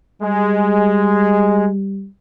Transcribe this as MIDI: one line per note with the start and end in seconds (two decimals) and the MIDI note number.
0.22 2.07 55
0.22 1.68 56